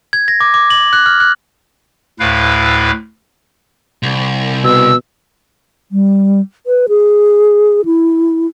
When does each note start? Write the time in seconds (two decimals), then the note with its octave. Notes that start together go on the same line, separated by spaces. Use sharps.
0.13 G#6
0.28 A#6
0.41 D6
0.54 D6
0.70 F#7
0.93 F#6
1.06 F6
1.20 F#6
2.20 D2 A2 E4 B4 F5
4.03 C2
4.64 B2 E6
5.92 G3
6.67 B4
6.89 G#4
7.85 E4